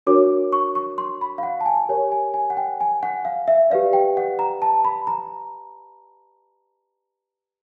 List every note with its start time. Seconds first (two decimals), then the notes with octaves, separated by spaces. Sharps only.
0.07 D4 F#4 A#4 C#5 D6
0.52 C#6
0.75 C#6
0.98 C6
1.21 B5
1.38 F5
1.43 F#5
1.61 A5
1.66 G#5
1.89 G4 A#4 C#5 G#5
2.12 G#5
2.34 G#5
2.50 F#5
2.57 G5
2.81 G#5
3.03 F#5
3.25 F5
3.48 E5
3.70 G4 B4 D5 F5
3.93 G5
4.17 F#5
4.39 A#5
4.62 A5
4.85 B5
5.07 A#5